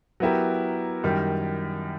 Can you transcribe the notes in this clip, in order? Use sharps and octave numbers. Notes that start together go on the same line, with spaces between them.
F#3 B3 E4 G4 A#4
F#2 D#3 G3